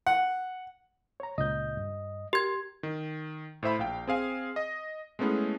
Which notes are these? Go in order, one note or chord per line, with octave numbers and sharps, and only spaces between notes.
F#5
C#5 A#5
C#2 A#2 D#5 G6
G2
G4 A#4 G#6
D#3
A2 C5 E5 B5
A#1 F5 G5
C4 G#4 F5 G#5
D#5
G#3 A3 B3 C#4 E4 G#4